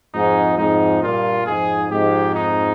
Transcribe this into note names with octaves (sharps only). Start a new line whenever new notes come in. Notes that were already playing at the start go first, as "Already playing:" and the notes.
F2 G#2 D#4
F2 G#2 D#4
G2 A#2 F4
F2 G#2 G#4
F2 G#2 G4
D#4